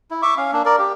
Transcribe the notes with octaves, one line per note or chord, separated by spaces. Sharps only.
E4
E5 C#6 D6
C#4 F5
A#3 D4
A#4 D5
G4